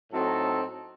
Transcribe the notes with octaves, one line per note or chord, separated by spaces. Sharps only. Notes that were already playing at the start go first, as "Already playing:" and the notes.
A2 F#3 C4 D#4 A4